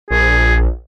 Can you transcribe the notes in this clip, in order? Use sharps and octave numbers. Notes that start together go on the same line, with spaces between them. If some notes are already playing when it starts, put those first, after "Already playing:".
A#1 G#4